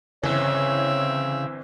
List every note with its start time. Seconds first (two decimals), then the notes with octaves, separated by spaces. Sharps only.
0.24 G1 C#3 E3 C4 C#5 E5